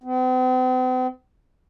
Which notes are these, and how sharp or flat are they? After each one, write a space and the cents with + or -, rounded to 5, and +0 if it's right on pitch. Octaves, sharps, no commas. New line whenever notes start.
C4 -45